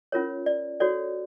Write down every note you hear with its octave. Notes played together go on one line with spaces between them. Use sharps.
C#4 F4 A#4 C#5
D5
F#4 A4 C#5 D5